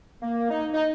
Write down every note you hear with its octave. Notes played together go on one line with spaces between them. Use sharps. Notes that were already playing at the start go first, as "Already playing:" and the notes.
A#3
D#4
D#4